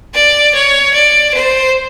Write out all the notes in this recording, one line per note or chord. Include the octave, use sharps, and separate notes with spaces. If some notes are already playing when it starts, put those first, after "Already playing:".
D5
C#5
D5
C5